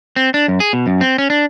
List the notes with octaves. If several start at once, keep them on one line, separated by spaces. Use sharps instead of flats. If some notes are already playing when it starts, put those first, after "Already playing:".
C4
D4
F#2
G#4
B2
F#2
C4
C#4
D4